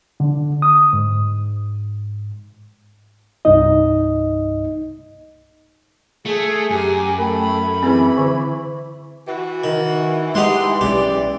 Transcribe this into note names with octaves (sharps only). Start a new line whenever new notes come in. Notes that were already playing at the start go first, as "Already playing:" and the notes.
D3
D#6
G#2
C2 G2 D#4 D#5
A3 G#4
F#2 G4 G#5
A3 A#4 G5 B5
E3 C4 G#4 B4
D3
E3 F#4
D#3
G#3 D#4 G4 F#5 C6
B1 G#3 C#4 G4 D5